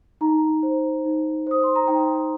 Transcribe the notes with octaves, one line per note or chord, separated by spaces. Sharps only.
D#4 A#5
C5
D#4
C5 D#6
C6
A#5
D#4 G5